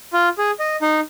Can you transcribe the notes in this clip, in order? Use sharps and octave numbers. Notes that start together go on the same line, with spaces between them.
F4
G#4
D#5
D#4